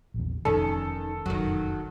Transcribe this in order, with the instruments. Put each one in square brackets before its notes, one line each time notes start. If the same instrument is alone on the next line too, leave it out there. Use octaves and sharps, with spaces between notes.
[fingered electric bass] A#1 E2
[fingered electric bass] F1 F2 G#3 [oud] D#3 C#4 [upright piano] A4
[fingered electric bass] F1 A#1 F#2 [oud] D#3 F#3